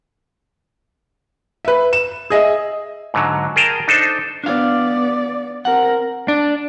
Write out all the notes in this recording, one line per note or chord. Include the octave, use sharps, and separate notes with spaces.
B4 E5
E7
G#4 D#5 E5
G#2 D3 F#3
G#4 A#4 G5 A5 A#5
D4 D#4 A4 C5
B3 D4 D5 F5
C4 A#4 F#5
D4